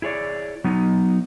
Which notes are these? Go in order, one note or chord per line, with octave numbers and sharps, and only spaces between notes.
E4 G#4 C#5 D5
F#3 B3 D#4